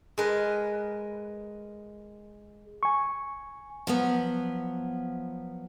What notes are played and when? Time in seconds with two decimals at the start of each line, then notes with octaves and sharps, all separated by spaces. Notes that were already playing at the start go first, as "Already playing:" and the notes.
0.18 G#3 A#4 B4
2.83 G#5 C#6
3.87 F3 F#3 B3